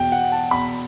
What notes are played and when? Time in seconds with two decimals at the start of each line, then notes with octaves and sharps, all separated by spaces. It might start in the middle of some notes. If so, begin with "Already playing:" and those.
Already playing: E2 B2 G5
0.12 F#5
0.32 A5
0.51 E2 B2 B5